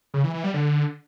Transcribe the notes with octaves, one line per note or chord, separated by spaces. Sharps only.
C#3
E3
E3
G3
D3